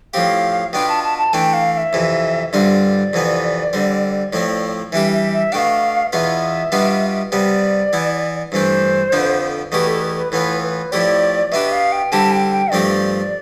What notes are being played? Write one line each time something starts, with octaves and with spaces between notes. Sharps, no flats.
A2 F3 C4 G4 F5
B2 B3 D4 F4 G5
A5
A5
A5
E3 A3 D4 G5
F5
F5
E5
F2 C3 E3
G2 D3 G3 C4 F4 D5
F2 C3 E3 B3
D3 G3 C4
A2 F3 A3 C4
E3 G3 D4 G4 E5
E5
E5
B2 A3 D4 F5 G5
E2 B2 B3 F4 E5
B2 G3 B3 D4 F4
C3 G3 B3 D5
E3 B3 E4
G2 E3 A3 D4 C5
F2 D3 F3 B3 D4
E2 B2 A3 E4 G4 B4
A4
B4
B4
A2 E3 B3 F4 B4
B4
A2 F3 A3 E4 G4 D5
B2 B3 D4 G4 E5
F5
G5
D3 G3 C4 E4 G4 A5
G5
G5
G2 F3 A3 C4 G4 D5